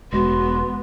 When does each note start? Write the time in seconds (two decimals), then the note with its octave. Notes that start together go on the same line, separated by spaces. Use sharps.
0.12 E1 G#3 B3 F#4 C6